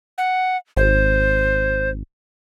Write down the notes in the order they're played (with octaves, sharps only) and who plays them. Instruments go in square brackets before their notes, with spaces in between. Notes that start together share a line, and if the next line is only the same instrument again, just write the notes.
[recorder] F#5
[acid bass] G#1 [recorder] C5